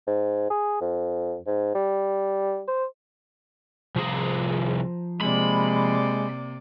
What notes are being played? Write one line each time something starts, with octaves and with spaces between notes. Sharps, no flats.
G#2
G#4
F2
G#2
G3
C5
C2 F3 G#4 C5 A#5
C3 G#3 A#3 D5 B5